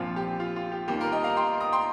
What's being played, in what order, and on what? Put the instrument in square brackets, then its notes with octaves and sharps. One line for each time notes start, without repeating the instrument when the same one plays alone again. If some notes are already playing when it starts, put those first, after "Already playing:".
Already playing: [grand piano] A#1 A#2 F3 C4 F4
G4
F4
F4
G4
D#2 D#3 G3 A#3 G4
F4 A#4
D#5 G5
F5 A#5
G5 C6
A#5 D#6
G5 C6